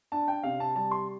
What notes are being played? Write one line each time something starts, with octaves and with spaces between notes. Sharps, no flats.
D4 A5
G5
C3 F5
A5
G3 A5
C6